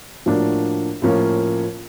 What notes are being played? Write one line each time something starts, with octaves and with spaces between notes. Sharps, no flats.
A2 F3 A#3 D4 F#4
A2 F3 A#3 C#4